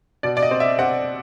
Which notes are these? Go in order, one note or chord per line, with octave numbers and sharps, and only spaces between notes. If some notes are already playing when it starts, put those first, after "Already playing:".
B2 D5
D5
D#5
C4
E5
C4 F#5